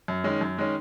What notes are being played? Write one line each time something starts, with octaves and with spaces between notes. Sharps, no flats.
F#2
D#3 G#3 C#4
F#2
D#3 G#3 C#4